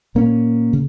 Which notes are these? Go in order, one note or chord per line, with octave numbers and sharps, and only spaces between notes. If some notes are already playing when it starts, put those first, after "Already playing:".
A#2 A#3 C#4
C#3